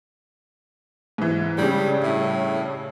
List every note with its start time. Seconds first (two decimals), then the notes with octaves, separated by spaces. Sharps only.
1.18 G#2 E3
1.58 G2 C#3 G3
2.03 A2